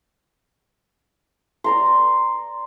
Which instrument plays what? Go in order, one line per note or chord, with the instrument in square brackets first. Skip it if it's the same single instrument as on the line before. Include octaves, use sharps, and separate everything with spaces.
[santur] D5 A#5 C6